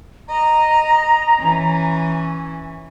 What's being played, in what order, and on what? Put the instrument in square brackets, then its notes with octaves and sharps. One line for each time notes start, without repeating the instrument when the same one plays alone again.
[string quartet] D#5 [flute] A#5
[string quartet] E3 C#4